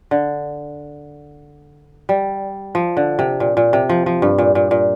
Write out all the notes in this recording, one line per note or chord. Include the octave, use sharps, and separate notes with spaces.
D3
G3
F3
D3
C3
A#2
A#2
C3
F3
F3
G2
A#2
A#2
A#2